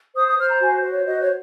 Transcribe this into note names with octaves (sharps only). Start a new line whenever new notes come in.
C5 D#6
D#6
C5 F6
A#5
F#4 G#5
C5
C#5
F#4 D#5
C#5